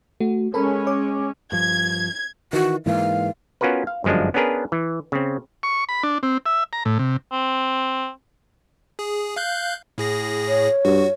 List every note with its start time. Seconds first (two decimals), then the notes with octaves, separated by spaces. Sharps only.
0.20 A3 F#4
0.54 G#3 C#4 A4 A#4 B5
0.87 C#5 D6
1.52 G2 F3 G#6
2.53 D#3 E3 F#4
2.86 G#2 E3 A#3 F5
3.61 B3 C#4 F4 F#4 A#4 B4
3.87 F5
4.04 G1 F#2 F3 G#3 D4
4.34 B3 C#4 D4 G#4 A#4 B4
4.72 E3
5.12 C#3 C4
5.63 C#6
5.89 B5
6.03 D4
6.23 C4
6.46 E5
6.73 A#5
6.85 A2
6.99 C3
7.32 C4
8.99 G#4
9.36 F5 F#6 G6
9.98 A2 G#4 A#6
10.47 C#5
10.85 G2 F#4